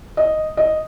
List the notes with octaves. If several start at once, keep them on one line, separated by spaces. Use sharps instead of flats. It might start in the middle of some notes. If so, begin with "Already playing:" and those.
D#5
D#5